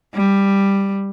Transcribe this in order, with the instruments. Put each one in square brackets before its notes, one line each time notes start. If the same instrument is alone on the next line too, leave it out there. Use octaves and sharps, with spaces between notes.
[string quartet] G3